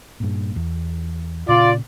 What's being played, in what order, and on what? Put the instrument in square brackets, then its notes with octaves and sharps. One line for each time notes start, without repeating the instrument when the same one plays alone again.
[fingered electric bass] G2 A#2
E2
[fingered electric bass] A#2 C#3 [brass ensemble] F4 D5